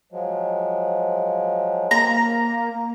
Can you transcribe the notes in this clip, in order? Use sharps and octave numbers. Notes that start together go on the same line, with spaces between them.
F3 F#3 G#3
A#3 A#5